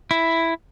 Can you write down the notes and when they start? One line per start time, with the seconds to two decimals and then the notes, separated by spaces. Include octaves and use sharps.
0.11 E4